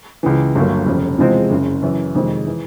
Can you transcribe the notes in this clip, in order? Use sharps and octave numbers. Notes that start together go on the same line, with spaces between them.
C#2 C#3 E3
G1 G2 D3 F#3 A#3
F1 F2 C#3
E2 C3 F3 G#3 C4
F#1 F#2 C#3
F#2 C#3 E3
F2 C3 D#3 G#3
E3